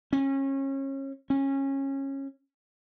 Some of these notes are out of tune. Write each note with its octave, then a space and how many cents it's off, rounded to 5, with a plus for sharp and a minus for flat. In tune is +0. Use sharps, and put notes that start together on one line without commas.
C#4 -30
C#4 -20